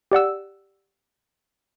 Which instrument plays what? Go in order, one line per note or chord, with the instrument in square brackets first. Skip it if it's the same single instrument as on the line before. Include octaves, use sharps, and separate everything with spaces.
[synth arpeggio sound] G4 D5 F#5 E6